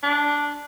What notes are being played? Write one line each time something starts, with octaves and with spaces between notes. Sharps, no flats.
D4